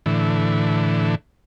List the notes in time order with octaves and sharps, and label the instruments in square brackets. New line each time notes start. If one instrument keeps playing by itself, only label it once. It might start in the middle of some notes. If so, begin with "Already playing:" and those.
[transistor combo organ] A2 D3 E3